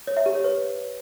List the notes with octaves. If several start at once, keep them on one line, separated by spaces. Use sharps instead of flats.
C#5
E5
G4
C#5
B4